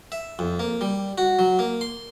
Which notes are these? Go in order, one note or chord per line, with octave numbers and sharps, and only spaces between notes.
E5
F2
A#3
G3
F#4
F#3
A#3
C6